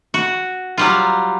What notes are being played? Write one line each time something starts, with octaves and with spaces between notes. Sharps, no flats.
F#4
F#3 G3 F4